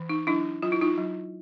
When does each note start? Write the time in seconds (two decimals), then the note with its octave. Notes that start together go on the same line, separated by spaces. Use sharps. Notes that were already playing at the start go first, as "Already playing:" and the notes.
Already playing: E3
0.09 D#4
0.27 F#3 D4 E4
0.62 F#3 F4
0.72 E4
0.81 D#4 F4
0.97 F#3